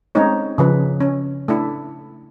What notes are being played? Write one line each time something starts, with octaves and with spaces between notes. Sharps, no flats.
G#3 A3 C4 C#4 D#4 C#5
C#3 F3 B4
C#4
A3 D4 E4